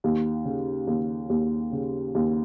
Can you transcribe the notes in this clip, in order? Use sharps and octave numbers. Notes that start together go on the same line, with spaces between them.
D#2
C#3
D#2
D#2
C#3
D#2